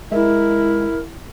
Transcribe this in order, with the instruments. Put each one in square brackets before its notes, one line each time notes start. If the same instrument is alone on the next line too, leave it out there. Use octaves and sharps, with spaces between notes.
[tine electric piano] G#3 E5 [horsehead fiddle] E4 [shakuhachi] A#4